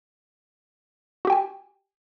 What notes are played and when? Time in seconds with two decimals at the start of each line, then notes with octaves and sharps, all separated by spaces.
1.25 F#4
1.27 G4
1.30 G5
1.32 G#5